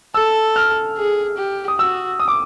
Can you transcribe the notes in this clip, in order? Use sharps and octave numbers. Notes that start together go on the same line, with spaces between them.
A4 E6
F6
G#4
G4
D#6
F#4 E6
D#6
D6